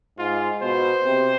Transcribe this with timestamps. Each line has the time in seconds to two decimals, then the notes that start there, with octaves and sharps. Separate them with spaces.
0.19 G#2 F4
0.62 B2 C5
1.05 C3